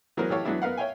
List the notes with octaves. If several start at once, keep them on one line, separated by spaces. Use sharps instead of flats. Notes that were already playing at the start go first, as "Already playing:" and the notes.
E3 F#3 B3 G#4 A#4 C5
E3 G4 A4 C#5 F5 C#6
E3 F#3 G#3 B3 D4 E4
B3 A#4 B4 F5 F#5
C#5 E5 F5 G5 G#5